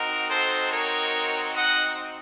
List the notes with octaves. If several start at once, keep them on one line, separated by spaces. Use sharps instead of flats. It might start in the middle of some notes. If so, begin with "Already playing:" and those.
Already playing: C4 D#4 F#4 A#4
A4 C5
A#4 C#5
D#5 F#5